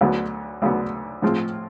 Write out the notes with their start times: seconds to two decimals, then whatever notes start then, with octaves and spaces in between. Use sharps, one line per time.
0.01 D2 D3 F#3 B3
0.62 D2 D3 F#3 B3
1.22 A2 F3 G#3 C4 F4